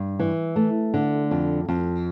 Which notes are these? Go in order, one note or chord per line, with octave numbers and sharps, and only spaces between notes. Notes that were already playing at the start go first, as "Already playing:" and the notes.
Already playing: G2
E3
A3
D3
F2
F2